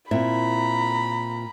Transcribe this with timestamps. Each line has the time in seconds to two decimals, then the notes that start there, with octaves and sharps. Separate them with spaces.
0.11 A#2 C4 E4 A#5 B5